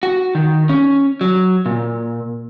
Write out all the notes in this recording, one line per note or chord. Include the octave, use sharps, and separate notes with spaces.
F#4
D#3
C#4
F#3
A#2